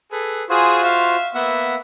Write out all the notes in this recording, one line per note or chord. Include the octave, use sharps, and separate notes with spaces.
G#4 A4 B4
F4 F#4 G#4 C5
E5 F5
A#3 B3 E5 F#5